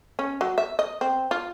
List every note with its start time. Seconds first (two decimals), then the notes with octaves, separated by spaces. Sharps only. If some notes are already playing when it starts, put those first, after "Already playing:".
0.19 C#4
0.41 F#3
0.58 E5
0.79 D#5
1.01 C4
1.31 F4